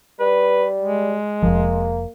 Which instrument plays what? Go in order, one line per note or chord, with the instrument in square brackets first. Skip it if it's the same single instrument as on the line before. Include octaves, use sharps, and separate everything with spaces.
[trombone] G3 [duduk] B4
[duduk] G#3
[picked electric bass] F1 A#1 F3 [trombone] A#3